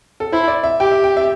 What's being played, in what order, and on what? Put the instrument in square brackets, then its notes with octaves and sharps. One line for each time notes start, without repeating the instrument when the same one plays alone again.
[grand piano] A4
[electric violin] E4 [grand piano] C5
[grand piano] D5
E5
[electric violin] G4 [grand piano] G5
[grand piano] E5
G5
E5